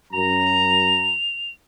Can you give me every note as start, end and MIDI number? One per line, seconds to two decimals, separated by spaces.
0.13 1.13 42
0.13 1.13 82
0.13 1.50 101